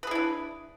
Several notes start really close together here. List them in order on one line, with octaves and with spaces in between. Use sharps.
B4 G#4 E4 D4